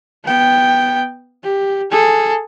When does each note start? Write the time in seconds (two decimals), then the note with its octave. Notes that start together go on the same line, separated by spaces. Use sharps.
0.24 B3 G5
1.43 G4
1.91 G#4 A4